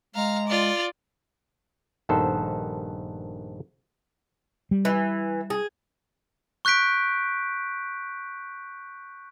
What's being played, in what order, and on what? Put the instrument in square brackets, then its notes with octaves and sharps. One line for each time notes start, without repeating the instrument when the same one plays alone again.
[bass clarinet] G#3 [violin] F5 A#5
[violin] F4 D5
[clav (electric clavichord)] A#1 G2 D#3 B3 A4 C5
[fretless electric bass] G3
[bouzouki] E3
G#4
[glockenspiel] C#6 F#6 G6 B6 D7